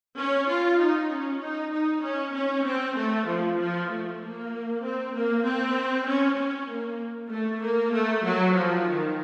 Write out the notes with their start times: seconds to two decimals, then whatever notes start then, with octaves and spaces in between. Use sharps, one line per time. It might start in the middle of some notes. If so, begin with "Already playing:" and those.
0.16 C#4
0.47 F4
0.78 D#4
1.09 C#4
1.40 D#4
1.71 D#4
2.02 C#4
2.33 C#4
2.64 C4
2.95 A3
3.26 F3
3.57 F3
3.88 A3
4.19 A#3
4.82 C4
5.12 A#3
5.44 C4
6.06 C#4
6.37 C#4
6.68 A#3
7.30 A3
7.62 A#3
7.92 A3
8.24 F#3
8.54 F3
8.86 D#3